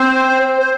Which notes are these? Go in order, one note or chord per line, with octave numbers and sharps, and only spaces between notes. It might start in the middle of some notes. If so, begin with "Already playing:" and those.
Already playing: C4 C5
C5